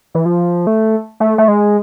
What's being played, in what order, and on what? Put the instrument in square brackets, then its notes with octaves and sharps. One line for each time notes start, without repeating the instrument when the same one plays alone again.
[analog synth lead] E3
F3
A3
A3
A3
G#3